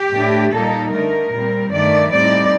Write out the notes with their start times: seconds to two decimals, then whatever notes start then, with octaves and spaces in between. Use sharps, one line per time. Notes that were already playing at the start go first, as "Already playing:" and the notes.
Already playing: G4
0.13 A2 A3 D4
0.52 A#2 G3 A#3 D#4 A4
0.92 D3 A3 D#4 A#4
1.32 A#2 G3 C4
1.71 G2 D#3 A3 D5
2.11 A2 G3 C4 D#4 D5